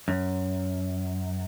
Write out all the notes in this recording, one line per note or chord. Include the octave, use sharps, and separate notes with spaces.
F#2